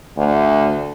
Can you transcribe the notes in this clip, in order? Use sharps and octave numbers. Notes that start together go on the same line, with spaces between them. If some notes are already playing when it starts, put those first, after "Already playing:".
D2